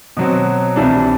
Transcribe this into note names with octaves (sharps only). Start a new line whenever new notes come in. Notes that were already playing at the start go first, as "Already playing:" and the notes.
B2 F#3 C4
C2 C3 E3 G3 D4